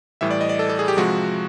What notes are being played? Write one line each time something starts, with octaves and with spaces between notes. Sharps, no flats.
A2 E3 G3 E5
D5
D#5
D5
A4
A4
G#4
G4
C3 F3 G#3 F#4